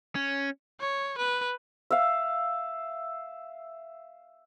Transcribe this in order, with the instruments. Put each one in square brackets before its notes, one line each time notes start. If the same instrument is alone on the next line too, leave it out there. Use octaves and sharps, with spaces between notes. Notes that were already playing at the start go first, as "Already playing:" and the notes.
[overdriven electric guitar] C#4
[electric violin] C#5
B4
[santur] E5 F5